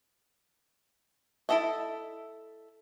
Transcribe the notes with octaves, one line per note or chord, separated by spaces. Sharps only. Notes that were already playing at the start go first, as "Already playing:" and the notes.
E4 G#4 A4 D#5 E5